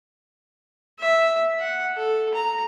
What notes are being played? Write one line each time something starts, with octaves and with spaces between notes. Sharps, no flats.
E5
F#5
A4
A#5